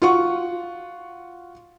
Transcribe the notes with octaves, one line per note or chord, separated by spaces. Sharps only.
F4 F#4 F#5 C#6